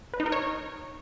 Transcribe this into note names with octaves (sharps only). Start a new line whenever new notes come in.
B4
D#4
A#4
C#5